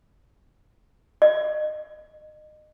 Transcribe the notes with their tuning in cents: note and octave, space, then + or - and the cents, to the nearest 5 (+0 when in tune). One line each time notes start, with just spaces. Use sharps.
D#5 -30